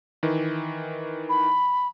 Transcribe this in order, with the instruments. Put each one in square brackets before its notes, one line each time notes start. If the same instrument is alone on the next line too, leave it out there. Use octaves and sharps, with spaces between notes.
[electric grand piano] D#3 E3
[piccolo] B5